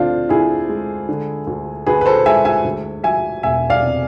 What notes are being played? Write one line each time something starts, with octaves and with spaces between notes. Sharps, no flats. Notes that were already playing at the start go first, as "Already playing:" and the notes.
Already playing: D2 D3 C4 D4 F4
D2 E4 G#4
G#3
D3
D2
D2 G#4 B4
B4
A4 C5
G#3 E5 G#5
E5 G#5
D2
F3 E5 G#5
E1 E5 G#5
D5 F5
C3